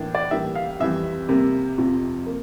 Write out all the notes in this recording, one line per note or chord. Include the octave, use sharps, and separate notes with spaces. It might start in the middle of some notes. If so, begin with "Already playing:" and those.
Already playing: A2 E3 A#3 D4
D5
A2 E3 G3 A#3 D4 E5
F5
F2 E3 G3 E5
C3 G3 A#3
F2 C3 F3
A#3